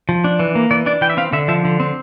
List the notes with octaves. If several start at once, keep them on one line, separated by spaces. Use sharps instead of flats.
F3
D4
E3
A#3
E3 D5
D4 D5
E3 G5
E5
C4 F5
D3 E5
F3 E5
D3
C4